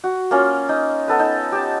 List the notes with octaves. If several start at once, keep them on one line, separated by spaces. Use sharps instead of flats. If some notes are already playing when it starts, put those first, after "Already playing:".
F#4
A#3 C#4 F4
D#4
B3 A4 B4
D#4
G4 A5